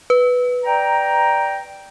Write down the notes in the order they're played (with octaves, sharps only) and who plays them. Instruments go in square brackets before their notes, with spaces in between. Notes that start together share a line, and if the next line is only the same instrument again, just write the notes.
[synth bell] B4
[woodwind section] D5 G5 A#5